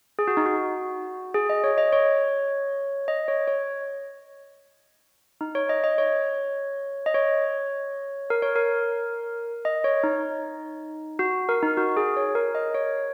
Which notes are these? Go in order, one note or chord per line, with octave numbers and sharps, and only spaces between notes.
G#4
F#4
D#4
F#4
G#4
D#5
C#5
D#5
C#5
D#5
C#5
C#5
D#4
C#5
D#5
D#5
C#5
D#5
C#5
A#4
C#5
A#4
D#5
C#5
D#4
F#4
A#4
D#4
F#4
G#4
C#5
A#4
D#5
C#5